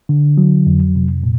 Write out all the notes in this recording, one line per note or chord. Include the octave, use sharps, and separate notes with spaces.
D3
F#3
F2
C3
A#2